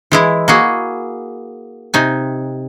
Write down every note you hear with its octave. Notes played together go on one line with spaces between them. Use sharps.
E3 G#3 E4
A#3 F#4 G#4
C3 D#4 G#5